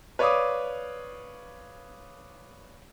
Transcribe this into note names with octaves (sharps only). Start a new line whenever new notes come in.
B4 C#5 D5 F5 D6 D#6